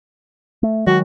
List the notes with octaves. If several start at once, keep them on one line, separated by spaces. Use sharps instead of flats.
A3
D#3 F#3 G#3 F#4